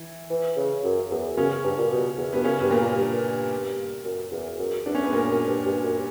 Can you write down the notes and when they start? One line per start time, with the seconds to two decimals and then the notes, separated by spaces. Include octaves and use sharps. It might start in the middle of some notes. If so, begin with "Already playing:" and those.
Already playing: E3
0.30 E3
0.56 C#3
0.83 F#2
1.10 E2
1.37 F#2 C#3 C#4
1.64 G2
1.78 A#2
1.91 B2
2.17 E2
2.33 G2 B3
2.44 F#2 C#3 C#4
2.60 G2 B3
2.70 A#2 A#3
2.80 A#2
2.98 G2
4.04 F#2
4.32 E2
4.59 F#2
4.86 E2 D4
4.95 C#4
5.04 B3
5.12 F#2 A#2 A#3
5.31 F#2
5.48 G2
5.66 G2
5.84 F#2